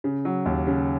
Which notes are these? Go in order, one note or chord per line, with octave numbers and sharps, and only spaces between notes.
C#3
F#3
D#2
C#3